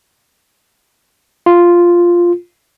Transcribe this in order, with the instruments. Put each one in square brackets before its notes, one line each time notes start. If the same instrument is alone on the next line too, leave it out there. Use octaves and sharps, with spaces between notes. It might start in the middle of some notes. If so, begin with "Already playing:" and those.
[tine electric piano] F4